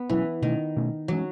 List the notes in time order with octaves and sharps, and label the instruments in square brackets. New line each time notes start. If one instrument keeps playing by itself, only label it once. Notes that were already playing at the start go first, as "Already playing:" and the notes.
Already playing: [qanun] B3
[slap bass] B2 F#3 C#4 [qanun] E3
[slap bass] B2 A3 C#4 [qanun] D#3
[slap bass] B2 A3 C#4
[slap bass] E3 G#3 C#4 [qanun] F#3